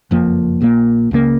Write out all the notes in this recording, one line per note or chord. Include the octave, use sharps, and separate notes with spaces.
F#1 F2 F3 A#3
A#1 A#2 F3 A#3
C#2 C#3 F3 A#3